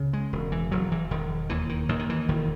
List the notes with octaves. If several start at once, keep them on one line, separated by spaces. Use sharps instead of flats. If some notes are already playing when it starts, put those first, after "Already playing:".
Already playing: C#2 C#3
G#3
E1
E3
E1 F#3
E3
E1 D#3
D#2 E3
D#3
D#2 D#3
D#3
E3
E1 D#3